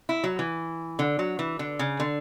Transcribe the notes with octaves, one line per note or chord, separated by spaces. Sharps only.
E4
F#3
E3
D3
F#3
E3
D3
C#3
D3